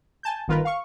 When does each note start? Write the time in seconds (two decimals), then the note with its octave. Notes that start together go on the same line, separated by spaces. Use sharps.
0.23 G#5 A5 G6
0.48 G1 D#3 F4 A#4 B4
0.65 F5 C#6